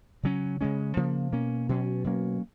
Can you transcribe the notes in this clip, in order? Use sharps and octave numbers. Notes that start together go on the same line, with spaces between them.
C#3 F#3 C#4
C#3 G#3 C#4
C#3 F3 A#3
B2 A#3 C#4
B2 F#3 C#4
B2 F#3 A#3 C#4